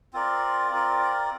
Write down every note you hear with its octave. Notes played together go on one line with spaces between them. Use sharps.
C4 F4 A#4 D5
C4 F4 A#4 D5